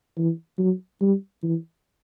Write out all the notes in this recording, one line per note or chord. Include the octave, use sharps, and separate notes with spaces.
E3
F#3
G3
E3